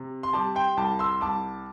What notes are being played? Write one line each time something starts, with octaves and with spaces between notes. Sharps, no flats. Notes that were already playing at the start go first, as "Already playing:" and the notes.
Already playing: C3
C6
G3 A5 D6
G5 C6
C2 A5 D6
C6 E6
C2 A5 D6